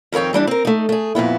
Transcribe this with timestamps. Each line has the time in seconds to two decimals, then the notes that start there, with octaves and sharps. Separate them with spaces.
0.12 F2 D#3 C4 C#5 G5
0.33 E3 G3 D4 E4
0.47 C4 A#4
0.65 A3 D#4
0.89 A3 G#4
1.15 F2 A#2 B3 E4